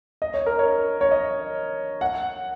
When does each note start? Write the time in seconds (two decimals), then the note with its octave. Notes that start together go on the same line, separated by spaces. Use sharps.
0.22 D#5
0.34 C#5
0.46 A#4
0.59 C#5
1.01 C#5
1.11 D#5
2.01 F#5